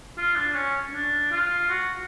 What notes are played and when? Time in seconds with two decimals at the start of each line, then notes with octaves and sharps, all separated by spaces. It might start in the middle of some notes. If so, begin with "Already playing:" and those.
0.18 F4
0.36 D4
0.55 C#4
0.93 D4
1.32 F4
1.70 F#4